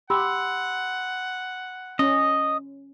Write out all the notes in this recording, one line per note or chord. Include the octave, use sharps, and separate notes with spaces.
G4 F#5 B5 C6 E6
C#4 D#5